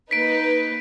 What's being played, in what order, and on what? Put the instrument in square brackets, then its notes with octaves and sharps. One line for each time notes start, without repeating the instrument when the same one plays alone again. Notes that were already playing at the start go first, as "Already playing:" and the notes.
[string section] A#3 D#4 B4 [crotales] B6 D7